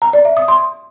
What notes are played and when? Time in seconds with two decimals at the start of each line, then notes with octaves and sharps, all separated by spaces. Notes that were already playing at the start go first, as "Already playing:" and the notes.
0.02 A#5
0.13 D5
0.25 E5
0.37 D#6
0.48 C6